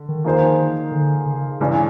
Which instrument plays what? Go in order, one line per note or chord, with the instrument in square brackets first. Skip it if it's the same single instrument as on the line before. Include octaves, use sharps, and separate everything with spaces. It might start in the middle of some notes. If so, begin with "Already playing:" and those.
Already playing: [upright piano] D3
[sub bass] D#3
[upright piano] F3 A#3 D#4 G#4 C5
[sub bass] D3
C#3
[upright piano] G2 E3 G#3 C#4 [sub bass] C#3